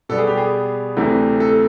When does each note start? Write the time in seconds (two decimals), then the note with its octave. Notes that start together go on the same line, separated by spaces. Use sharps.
0.09 B2 G3 B3 A4
0.18 G#4
0.27 G4
0.37 G#4
0.96 D2 C3 E3 A3
1.40 A4